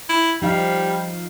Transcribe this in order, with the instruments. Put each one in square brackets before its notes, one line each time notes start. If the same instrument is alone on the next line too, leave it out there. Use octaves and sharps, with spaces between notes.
[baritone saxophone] E4
[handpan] F3 D#4 F5 [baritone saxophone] G3